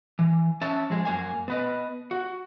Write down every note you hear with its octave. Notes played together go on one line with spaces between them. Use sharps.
E3
C#4 E5 A5
F3 G#3 G#4
F#2 A#3 G#5
B3 B4 D#5
F#4